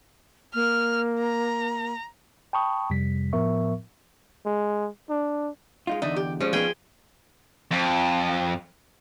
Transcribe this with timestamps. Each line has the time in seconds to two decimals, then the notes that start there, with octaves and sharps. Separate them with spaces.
0.54 A#3 F6
1.20 A#5
2.53 G5 A5 B5 C#6 D#6
2.90 F2 C3 G3 B6
3.33 A2 F3 B3 A#4 E5 C#6
4.45 G#3
5.10 D4
5.87 G#3 D#4 F4
6.02 E2 D3 D#4 D5 E5
6.16 G4
6.40 F3 G3 G#3 C#4
6.53 F3 B3 D#4 G#4 G5
7.71 F2